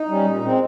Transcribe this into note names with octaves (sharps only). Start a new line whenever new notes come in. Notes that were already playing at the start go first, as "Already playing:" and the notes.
Already playing: D#4
G3 C#4
A#2
G#3 C4